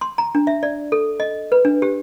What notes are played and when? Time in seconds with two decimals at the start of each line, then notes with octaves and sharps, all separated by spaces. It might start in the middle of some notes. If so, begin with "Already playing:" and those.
0.01 C6
0.18 A#5
0.35 D4
0.47 E5
0.63 D5
0.92 A4
1.20 D#5
1.52 B4
1.65 D4
1.82 G4